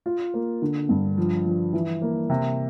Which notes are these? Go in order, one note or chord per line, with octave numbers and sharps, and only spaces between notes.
F4
A#3
D3
G2
F3
F3
E3
A#3
C3